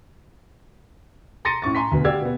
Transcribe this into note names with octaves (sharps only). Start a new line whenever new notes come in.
A#5 C6 A6 A#6 C#7 D#7
A2 C#4 C#6 A6
G#5 A#5 C6 B6
D2 B2
F#4 G4 D5 F5 E6 G#6
B2 B3